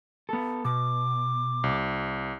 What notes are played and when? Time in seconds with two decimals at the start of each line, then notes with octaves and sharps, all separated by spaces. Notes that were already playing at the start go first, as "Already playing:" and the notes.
0.29 B3 A4
0.65 B2 D6
1.64 C2